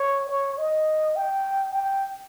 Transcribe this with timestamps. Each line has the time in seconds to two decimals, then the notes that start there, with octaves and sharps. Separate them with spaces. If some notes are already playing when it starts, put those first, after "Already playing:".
Already playing: C#5
0.29 C#5
0.58 D#5
1.16 G5
1.74 G5